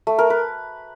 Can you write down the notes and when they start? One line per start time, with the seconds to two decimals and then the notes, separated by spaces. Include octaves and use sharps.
0.07 A3
0.19 A#4
0.30 B4